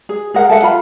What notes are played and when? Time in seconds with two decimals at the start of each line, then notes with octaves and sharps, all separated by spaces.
0.09 G#4
0.34 G#4 A#4 F#5
0.49 A4 E5 F#5
0.62 F4 B5